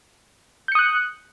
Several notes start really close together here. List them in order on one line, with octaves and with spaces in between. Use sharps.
G6 C#7 D#6 F#6